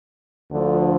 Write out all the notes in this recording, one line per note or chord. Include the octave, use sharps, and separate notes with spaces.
D2 D3 F3